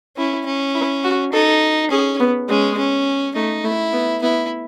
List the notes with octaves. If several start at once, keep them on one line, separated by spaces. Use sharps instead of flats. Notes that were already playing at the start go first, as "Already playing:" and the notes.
C#4 E4
C#4
E4
F#4
D#4 A4
C#4 G#4
B3
G#3 C#4
C#4
A3 D#4
A3 E4
B3
B3 E4